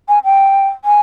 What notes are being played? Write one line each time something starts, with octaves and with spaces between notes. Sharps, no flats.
G#5
G5
G#5